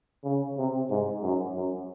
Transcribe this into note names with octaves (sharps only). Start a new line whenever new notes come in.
C#3
C3
G#2
F#2
F#2